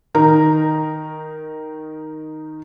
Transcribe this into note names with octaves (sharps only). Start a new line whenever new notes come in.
D#3 D#4 A#4 A#5